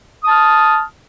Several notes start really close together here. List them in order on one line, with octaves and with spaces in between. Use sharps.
D#6 A5 F6